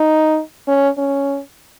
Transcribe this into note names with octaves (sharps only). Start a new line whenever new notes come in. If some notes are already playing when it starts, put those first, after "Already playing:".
Already playing: D#4
C#4
C#4